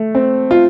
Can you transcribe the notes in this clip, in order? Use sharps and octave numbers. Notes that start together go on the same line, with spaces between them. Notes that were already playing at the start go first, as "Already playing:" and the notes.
Already playing: A3
C4
F4